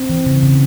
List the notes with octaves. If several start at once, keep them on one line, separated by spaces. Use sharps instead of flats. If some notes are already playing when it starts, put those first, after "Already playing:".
Already playing: C4
E3
C#3
C#3